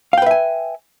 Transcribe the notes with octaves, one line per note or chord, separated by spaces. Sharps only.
B4 E5 F5 G5 G#5